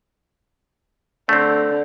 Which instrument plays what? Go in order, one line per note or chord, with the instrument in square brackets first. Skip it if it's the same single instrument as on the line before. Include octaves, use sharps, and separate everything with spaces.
[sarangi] D3 [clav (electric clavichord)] A3 C4